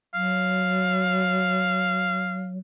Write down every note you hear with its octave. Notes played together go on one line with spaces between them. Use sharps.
F#3 F5